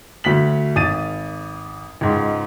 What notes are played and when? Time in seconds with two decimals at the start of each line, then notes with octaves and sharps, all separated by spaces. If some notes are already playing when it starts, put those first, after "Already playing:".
0.24 D2 F#4 B6 F#7
0.76 G#1 D#6 A6 D#7
2.01 C#2 G#2